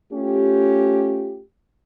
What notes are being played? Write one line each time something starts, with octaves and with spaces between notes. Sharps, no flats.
A3 C#4 F4 G4